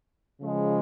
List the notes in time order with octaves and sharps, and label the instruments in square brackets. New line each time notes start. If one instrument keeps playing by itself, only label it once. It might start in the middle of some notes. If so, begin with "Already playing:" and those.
[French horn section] C#3 F3 G#3